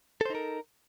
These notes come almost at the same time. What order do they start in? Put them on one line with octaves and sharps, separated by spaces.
A4 C5 D#4 A#4